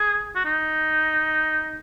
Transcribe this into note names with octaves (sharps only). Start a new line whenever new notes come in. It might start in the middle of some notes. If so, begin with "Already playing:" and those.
Already playing: G#4
F#4
D#4